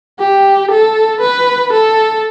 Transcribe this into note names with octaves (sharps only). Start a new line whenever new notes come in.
G4
A4
B4
A4